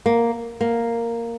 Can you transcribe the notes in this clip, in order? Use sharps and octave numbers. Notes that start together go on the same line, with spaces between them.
A#3
A#3